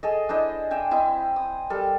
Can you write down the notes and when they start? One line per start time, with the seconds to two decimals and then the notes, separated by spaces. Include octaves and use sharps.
0.03 G#4 A4 D#5
0.29 D4 E4 C5 D#5
0.71 E5 G5 G#5
0.91 C4 E4 D#5
1.36 D#6
1.70 G3 A4 A#4